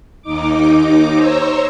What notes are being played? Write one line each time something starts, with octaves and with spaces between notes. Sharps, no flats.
D#2 D#4 D6
C5 C#5 A#5 E6